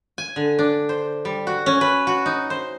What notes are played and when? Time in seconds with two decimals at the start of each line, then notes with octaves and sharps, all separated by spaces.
0.18 G#5
0.36 D3
0.59 D4
0.89 C5
1.25 G3
1.47 F#4
1.66 C#4
1.81 B4
2.07 F#4
2.26 D#4
2.50 C5